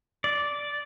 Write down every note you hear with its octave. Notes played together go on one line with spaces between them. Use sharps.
D5